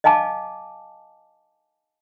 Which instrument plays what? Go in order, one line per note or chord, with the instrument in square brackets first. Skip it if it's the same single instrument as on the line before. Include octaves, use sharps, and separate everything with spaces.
[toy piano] D#5 F5 G#5 A5 D6